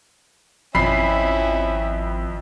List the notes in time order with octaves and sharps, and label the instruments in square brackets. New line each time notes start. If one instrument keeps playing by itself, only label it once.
[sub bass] G#1 [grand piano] F2 B5 C7 [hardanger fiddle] C#4 E4